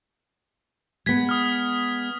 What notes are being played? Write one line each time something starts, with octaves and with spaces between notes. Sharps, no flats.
G#3 B3 G#6 B6
D#6 F6